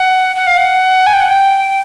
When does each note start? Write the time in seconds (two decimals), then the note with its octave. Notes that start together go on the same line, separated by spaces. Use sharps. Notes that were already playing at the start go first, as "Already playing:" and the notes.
Already playing: F#5
0.36 F#5
0.47 F5
0.58 F#5
1.07 G#5
1.13 G5
1.20 F#5
1.28 G5